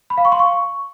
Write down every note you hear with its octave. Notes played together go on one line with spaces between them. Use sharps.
B5
F5
C#6
C6
C#6